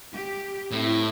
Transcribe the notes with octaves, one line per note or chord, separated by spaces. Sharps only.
G4
A2 C4 E4